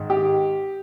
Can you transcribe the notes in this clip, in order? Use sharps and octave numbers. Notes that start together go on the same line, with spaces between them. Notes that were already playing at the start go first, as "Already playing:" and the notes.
Already playing: G#2 D#3 G#3
G4